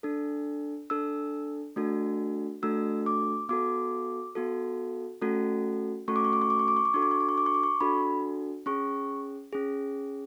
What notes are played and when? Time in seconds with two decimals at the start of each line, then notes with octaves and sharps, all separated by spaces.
0.03 D4 A4
0.90 D4 A4 E6
1.76 A3 D4 F#4 A4
2.63 A3 D4 F#4 A4 E6
3.06 D6
3.49 B3 F#4 A4 D6
4.35 B3 F#4 A4
5.21 A3 C#4 F#4 A4
6.08 A3 C#4 F#4 A4 C#6
6.16 D6
6.25 C#6
6.33 D6
6.42 C#6
6.50 D6
6.59 C#6
6.68 D6
6.77 C#6
6.85 D6
6.94 D4 F#4 A4 C#6
7.02 D6
7.11 C#6
7.20 D6
7.29 C#6
7.38 D6
7.46 C#6
7.54 D6
7.63 C#6
7.81 D4 F#4 A4 B5
8.66 C#4 G#4 C#6
9.53 C#4 G#4